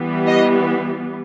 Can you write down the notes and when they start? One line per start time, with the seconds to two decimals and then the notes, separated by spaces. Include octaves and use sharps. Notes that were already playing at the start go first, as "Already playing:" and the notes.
Already playing: E3 G3 B3
0.27 D#5